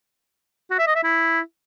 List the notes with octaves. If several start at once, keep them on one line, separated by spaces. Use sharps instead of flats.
F#4
E5
D#5
E5
E4